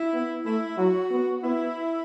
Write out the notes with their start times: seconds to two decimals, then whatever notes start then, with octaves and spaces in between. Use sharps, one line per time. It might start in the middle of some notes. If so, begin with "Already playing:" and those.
Already playing: E4
0.14 B3
0.45 A3 E4
0.78 F#3 F#4
1.11 B3
1.43 B3 E4